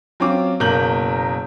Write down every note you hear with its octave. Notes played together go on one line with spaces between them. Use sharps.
F#3 C4 C#4 F4 D6
F#1 B2 A#3 A#5 G6 F#7